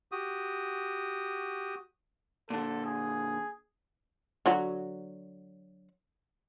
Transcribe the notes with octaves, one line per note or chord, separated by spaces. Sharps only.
F#4 G4 D#6
A#2 D3 A4
G#4
D3 F#3 F#4